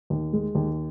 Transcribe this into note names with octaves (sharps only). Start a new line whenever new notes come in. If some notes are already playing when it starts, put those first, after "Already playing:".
D#2
G#3
D#2